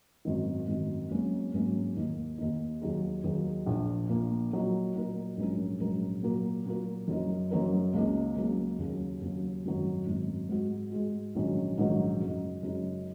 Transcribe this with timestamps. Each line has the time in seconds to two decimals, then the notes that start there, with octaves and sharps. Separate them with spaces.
0.25 G#1 F#2 D#3
0.68 G#1 F#2 D#3
1.11 G#1 G#2 F#3 A#3 C#4
1.53 G#1 G#2 F#3 A#3 C#4
1.96 D#2 D#3 A#3 D#4
2.38 D#2 D#3 A#3 D#4
2.82 D#2 D#3 F#3 D#4 G#4
3.24 D#2 D#3 F#3 D#4 G#4
3.66 A#1 A#2 A#3
4.09 A#1 A#2 A#3
4.52 A#2 F#3 D#4 A#4
4.94 A#2 F#3 D#4 A#4
5.37 A#1 G#2 F#3 C#4 A#4
5.80 A#1 G#2 F#3 C#4 A#4
6.23 A#2 F#3 A#3 F#4 A#4
6.65 A#2 F#3 A#3 F#4 A#4
7.08 F#1 F#2 F#3 D#4 A#4
7.51 F#1 F#2 F#3 D#4 A#4
7.94 C#2 C#3 F#3 A#3 D#4
8.36 C#2 C#3 F#3 A#3 D#4
8.78 D#2 C#3 F#3
9.21 D#2 C#3 F#3
9.65 G#1 F#2 D#3 F#3
10.07 G#1 F#2 D#3 F#3
10.49 G#2 G#3 F#4
10.92 G#2 G#3 F#4
11.35 A#1 G#2 D#3 F#3 C#4
11.78 A#1 G#2 D#3 F#3 C#4
12.20 F#2 C#3 G#3 D#4
12.63 F#2 C#3 G#3 D#4